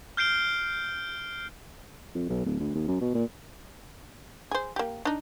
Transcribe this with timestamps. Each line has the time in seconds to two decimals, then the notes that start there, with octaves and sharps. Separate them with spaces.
0.17 F6 G6 C7 D7 G7
2.15 F2
2.29 B1
2.46 D1
2.60 D2
2.75 D#2
2.88 F#2
3.01 B2
3.15 A#2
4.51 G#4 C5
4.76 A#3 G4
5.05 D4 D#4